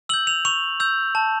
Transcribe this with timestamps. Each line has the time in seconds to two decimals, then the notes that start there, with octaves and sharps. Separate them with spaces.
0.09 E6 G6 F#7
0.27 F7
0.45 C#6 F7
0.80 E6 G6
1.15 A5